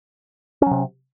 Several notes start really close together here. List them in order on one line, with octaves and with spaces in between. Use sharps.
C#4 F#3 C3